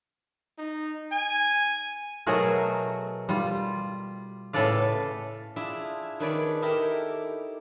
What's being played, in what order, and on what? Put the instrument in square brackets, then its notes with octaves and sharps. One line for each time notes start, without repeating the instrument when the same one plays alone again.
[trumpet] D#4
G#5
[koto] B2 F#3 A3 F#4 G#4 A#4
G3 F4
A2 C#3 A4 B4 D5 F5
[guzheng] D4 E4 F4 G#4 E5
D#3 D4 G#4 B4 C#5 D5
D#4 E4 G4 A4 A#4 E5